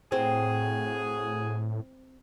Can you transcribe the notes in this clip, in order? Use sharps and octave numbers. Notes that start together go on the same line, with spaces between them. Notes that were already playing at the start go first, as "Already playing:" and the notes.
A2 C4 F#4 G#4